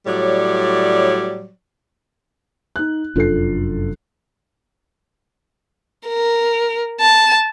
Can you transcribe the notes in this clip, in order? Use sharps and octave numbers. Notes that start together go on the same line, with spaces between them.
A2 F#3 G3 C#5 D5
D#4 F#6
F1 F#2 D4 F4 A4 C7
A#4
A5